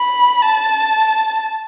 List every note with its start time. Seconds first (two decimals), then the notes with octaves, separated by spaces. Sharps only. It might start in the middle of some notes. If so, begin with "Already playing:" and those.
Already playing: B5
0.42 A5